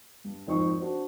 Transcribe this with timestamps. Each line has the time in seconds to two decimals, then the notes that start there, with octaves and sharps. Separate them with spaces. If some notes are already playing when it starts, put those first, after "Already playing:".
0.24 G2
0.47 G#1 F2 D#4 C5 C#6
0.80 D4 F#4 C5